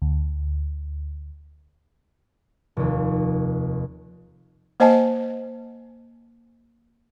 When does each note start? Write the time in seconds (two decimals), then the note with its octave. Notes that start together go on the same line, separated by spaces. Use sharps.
0.02 D2
2.77 F1 D#2
4.80 A#3 C5 D#5 G#5 A5